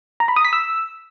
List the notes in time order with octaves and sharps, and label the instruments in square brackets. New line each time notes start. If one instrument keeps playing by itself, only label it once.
[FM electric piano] A#5
B5
D#6
B6
E6